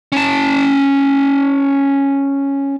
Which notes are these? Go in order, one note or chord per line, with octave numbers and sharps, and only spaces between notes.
C#4 A5